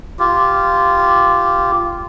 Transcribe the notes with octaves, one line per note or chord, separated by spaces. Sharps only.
F4 G4